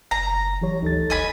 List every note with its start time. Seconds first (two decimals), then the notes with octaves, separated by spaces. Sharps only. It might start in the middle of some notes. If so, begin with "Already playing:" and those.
0.11 F#1 A#5
0.61 E3 F#3 G4 C#5
0.82 D2 D#4 A4 A6
1.10 G1 D#5 G#5 B5